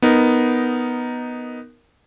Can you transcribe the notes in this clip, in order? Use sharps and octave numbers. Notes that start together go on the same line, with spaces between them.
B3 D#4 A#4